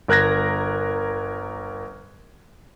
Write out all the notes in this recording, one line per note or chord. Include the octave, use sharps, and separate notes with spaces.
G1 A#4 F#6 G#6 A#6